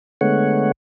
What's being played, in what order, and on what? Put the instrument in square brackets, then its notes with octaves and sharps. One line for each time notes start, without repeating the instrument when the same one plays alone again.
[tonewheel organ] D3 G#3 A3 B3 C#5 F#5